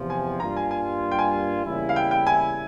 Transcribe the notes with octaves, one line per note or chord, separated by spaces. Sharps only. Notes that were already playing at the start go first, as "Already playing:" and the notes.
Already playing: E2 C3 F3
G#5
G2 G3 A#3 F4 A#5
G#5
G#5
G5
G#5
E2 C#3 G3 A#3 E4
F5
G5
G5
G#5